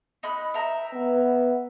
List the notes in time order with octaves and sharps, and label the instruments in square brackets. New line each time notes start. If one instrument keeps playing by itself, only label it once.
[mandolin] D#4 B5 F#6
E5 G5 A#5
[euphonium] B3